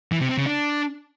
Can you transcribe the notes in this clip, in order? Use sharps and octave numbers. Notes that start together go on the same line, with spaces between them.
E3
C3
C4
C#3
D4